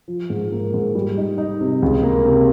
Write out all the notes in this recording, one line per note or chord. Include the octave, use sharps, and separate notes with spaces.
F3
G#2
A#3
G#2
G3
D#4
D#4
C3
C#2
A#3
C3